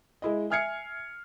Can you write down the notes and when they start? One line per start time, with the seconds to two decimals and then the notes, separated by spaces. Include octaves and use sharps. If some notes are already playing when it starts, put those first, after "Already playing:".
0.22 G#3 E4 D#5
0.50 E5 G#5 F6 G#6 C7 C#7